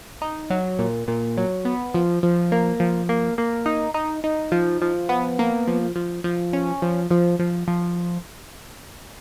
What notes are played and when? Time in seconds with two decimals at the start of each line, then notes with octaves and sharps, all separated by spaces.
0.22 D#4
0.50 F#3
0.79 A#2
1.08 A#2
1.37 F#3
1.65 B3
1.94 F3
2.23 F3
2.52 A#3
2.80 F3
3.09 A#3
3.38 A#3
3.66 D#4
3.94 D#4
4.24 D#4
4.52 F3
4.82 F3
5.09 B3
5.39 A#3
5.68 F3
5.96 F3
6.24 F3
6.53 C#4
6.82 F3
7.11 F3
7.39 F3
7.68 F3